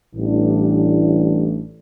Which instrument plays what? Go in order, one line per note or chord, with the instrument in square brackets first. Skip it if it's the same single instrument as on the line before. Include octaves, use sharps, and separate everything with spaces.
[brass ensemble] A1 A2 E3 G3 D4